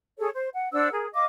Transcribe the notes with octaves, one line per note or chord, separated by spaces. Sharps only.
G#4 A4 C#5
C5
F#5
D4 C5 F#5 E6
G#4 A#4
D#5 F5 D6